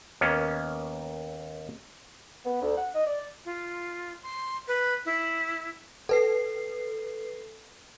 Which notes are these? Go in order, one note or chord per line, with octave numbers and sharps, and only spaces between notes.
D#2 A#3 B3 C#4
B3
D2
F#5
D#5
D5
F4
C6
B4
E4
A4 B4 C7